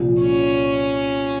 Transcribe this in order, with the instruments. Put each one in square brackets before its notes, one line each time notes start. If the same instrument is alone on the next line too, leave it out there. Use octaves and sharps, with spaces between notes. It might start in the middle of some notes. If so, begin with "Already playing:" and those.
Already playing: [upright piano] C2 A#2 F3
[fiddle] C#4